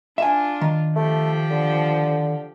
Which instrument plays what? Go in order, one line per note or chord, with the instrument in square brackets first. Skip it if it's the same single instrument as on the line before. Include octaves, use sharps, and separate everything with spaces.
[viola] D4 F4 [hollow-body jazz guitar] E5 G#5
[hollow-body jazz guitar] D#3
[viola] F3 G4 [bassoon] A3
[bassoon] D3